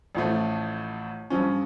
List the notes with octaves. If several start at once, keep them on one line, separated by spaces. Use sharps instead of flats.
A1 A2 F3 A3
G2 F3 C#4